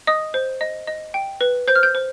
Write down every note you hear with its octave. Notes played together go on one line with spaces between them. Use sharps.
D#5 D#6
C5
D#5
D#5
G5
B4
C5 G6
F6
G6
C5